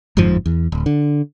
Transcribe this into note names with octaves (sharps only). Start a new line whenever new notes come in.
G1 F2 G#2 F3
E2
D1
D3